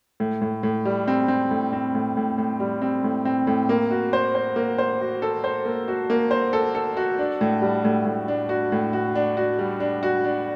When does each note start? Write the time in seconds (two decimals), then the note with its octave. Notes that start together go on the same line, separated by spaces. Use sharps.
0.20 A2
0.42 A2
0.63 A2
0.85 G3
1.08 C4
1.28 C4
1.51 A2
1.73 C4
1.95 A2
2.17 A2
2.38 A2
2.60 G3
2.82 C4
3.04 A2
3.25 C4
3.47 A2
3.69 A#3
3.91 F#4
4.13 C5
4.35 C5
4.56 A#3
4.78 C5
5.01 F#4
5.22 A4
5.44 C5
5.65 A#3
5.88 F#4
6.10 A#3
6.31 C5
6.53 A4
6.75 A4
6.97 F#4
7.19 D4
7.41 A2
7.62 G3
7.84 A2
8.06 A2
8.28 D4
8.49 F#4
8.72 A2
8.93 F#4
9.15 D4
9.37 F#4
9.59 G3
9.80 D4
10.03 F#4
10.24 D4